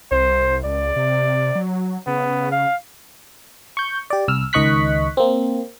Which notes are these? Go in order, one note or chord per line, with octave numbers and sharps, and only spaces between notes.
C2 C5
C#2 D5
C3
F#3
C#3 B3
F5
C#6 G6
G4 D5
C2 E6 F6
C#2 D#3 D#5 C#6 F#6 B6
A#3 C4